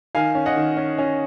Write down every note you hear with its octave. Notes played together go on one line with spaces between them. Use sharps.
D#3 F5 G#5
C#4
D#5 F#5
D#3
C#4
C#4